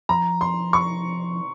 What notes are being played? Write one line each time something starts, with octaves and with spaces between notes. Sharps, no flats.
F3 A#5
C6
C#6